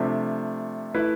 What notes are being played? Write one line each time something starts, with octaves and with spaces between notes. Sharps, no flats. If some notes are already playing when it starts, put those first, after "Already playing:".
Already playing: C3 F3 A3 D4
A3 E4 B4